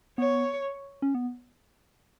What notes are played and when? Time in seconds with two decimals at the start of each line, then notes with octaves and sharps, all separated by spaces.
0.18 B3 C#5
1.02 C#4
1.15 B3